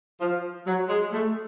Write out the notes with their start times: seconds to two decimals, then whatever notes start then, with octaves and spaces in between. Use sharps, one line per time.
0.21 F3
0.67 F#3
0.89 G#3
1.12 A3